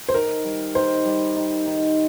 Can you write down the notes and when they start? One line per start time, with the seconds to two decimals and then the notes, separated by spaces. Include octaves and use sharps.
0.09 C5
0.14 D#3 A#4
0.45 G3
0.75 D#3 C5
1.05 G3
1.36 D#3
1.66 D#3